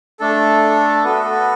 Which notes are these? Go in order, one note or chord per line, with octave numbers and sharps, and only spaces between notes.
A3 D4 A4
B3 F#4 A4 B4